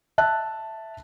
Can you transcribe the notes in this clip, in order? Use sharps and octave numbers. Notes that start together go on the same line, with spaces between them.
E5 A5 F#6